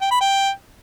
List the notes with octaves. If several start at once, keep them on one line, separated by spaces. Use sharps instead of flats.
G5
B5
G5